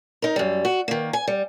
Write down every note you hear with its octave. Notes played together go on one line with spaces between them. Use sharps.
D#4 A#4
F#2 G3
F#4
D#3 A#3
G#5
G3